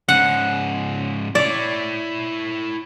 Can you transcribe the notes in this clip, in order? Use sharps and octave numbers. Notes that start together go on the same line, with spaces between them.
G#2 C#3 F#5
E4 C#5 D5